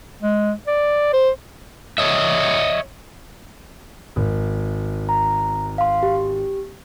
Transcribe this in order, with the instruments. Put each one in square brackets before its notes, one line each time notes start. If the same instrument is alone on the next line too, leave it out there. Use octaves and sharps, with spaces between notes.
[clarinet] G#3
D5
C5
[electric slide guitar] C#5 D#5 E5
[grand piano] G#1
[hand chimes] A#5
F5 C6
G4